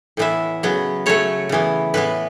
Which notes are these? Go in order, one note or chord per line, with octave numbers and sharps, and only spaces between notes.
A2 E3 B3 E5
C#3 F#3 B3
C#3 F#3 A3 C#5
C#3 E3 B3
A2 E3 B3 B4